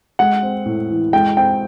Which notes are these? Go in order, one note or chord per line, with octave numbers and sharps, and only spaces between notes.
G#3 F#5
C4
A2
E3
G#3 G5
C4 G5